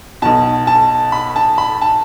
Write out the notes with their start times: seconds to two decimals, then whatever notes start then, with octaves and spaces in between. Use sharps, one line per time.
0.22 B1 B2 A5
0.67 A5
1.12 B5
1.36 A5
1.58 B5
1.82 A5